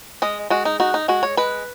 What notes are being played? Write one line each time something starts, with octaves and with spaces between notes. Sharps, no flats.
G#3 D#5
G#3 F#4
D#4
D#4 F#4
D#4
G#3 F#4
C#5
G#3 B4